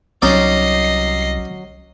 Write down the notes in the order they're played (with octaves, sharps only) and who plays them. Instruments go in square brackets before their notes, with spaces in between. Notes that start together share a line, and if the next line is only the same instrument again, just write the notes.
[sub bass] C2 [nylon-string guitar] F#3 [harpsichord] C#4 D#4 D5 [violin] D#5 C7